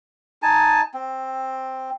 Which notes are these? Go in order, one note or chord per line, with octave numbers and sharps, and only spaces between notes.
D#4 G#5 A5
C4